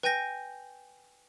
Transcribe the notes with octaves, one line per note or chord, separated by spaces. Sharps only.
B4 G5 G#5 G6 A#6